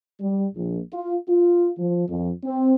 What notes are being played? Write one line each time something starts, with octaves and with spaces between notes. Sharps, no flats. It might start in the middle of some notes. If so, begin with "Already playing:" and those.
G3
A#1
F4
F4
F3
F2
C4